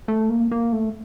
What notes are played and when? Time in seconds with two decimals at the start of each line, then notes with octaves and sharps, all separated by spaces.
0.08 A3
0.29 A#3
0.51 A#3
0.73 A3